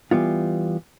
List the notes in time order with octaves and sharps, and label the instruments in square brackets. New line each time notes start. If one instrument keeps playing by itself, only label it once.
[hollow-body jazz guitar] E3 G3 B3 F4